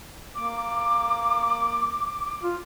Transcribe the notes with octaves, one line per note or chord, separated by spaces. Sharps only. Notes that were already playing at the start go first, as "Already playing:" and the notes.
A#3 D6
F4